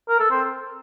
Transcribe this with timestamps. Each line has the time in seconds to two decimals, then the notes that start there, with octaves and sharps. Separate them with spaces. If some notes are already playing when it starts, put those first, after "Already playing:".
0.09 A#4
0.19 A4
0.31 C4